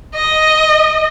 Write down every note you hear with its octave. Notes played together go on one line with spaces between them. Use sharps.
D#5